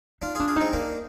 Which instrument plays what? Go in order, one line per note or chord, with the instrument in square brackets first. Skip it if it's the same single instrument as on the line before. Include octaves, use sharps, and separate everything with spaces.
[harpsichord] D4 F4 [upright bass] D#4
[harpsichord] F4 G#4
[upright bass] D4
[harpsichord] F4 G#4
[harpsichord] G#3 C4 [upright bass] D#4
[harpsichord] A#3 D4 [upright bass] D#4